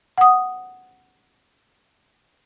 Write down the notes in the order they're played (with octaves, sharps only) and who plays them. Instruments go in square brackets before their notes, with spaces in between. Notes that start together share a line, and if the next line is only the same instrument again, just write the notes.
[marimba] F#5 D#6